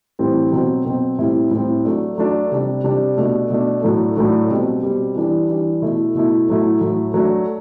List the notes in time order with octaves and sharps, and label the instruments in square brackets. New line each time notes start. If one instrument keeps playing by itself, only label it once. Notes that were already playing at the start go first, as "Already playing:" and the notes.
[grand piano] A2 E3 G3 C4
B2 F#3 C4
B2 F#3 C4
A2 G3 C4 E4
A2 G3 C4 E4
F#3 A3 D4
F#3 A3 D4
C3 G3 D4
C3 G3 D4
B2 A3 D4
B2 A3 D4
A2 F#3 A3 D4
A2 F#3 A3 D4
B2 G3 C4
B2 G3 C4
E3 G3 D4
E3 G3 D4
B2 A3 E4
B2 A3 E4
A2 F#3 A3 E4
A2 F#3 A3 E4
F#3 A3 D4